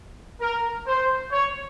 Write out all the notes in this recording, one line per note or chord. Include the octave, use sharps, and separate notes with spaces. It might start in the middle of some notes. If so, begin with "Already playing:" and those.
A#4
C5
C#5